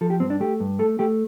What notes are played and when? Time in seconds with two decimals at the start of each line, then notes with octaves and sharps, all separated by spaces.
0.01 F3 A4
0.10 G4
0.20 G2 C4
0.30 D4
0.41 A3 G4
0.60 G2
0.79 A3 A4
0.99 A3 G4